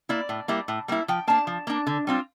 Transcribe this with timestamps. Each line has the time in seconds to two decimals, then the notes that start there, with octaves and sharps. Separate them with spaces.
0.09 A#3 E4 D5
0.29 A2
0.48 G3 A#3 E4
0.68 A2
0.88 G3 A#3 E4
1.08 F3 G5
1.27 A#3 D4 A5
1.47 F3
1.67 A#3 D4
1.87 D3
2.07 G3 C4 F4